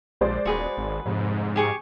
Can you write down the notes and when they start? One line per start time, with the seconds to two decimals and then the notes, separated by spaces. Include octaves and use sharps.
0.21 A#1 G#3 C5 D5
0.45 D#1 F#4 G#4 B4
0.78 G#1
1.06 F1 G#2
1.56 G4 G#4 C#6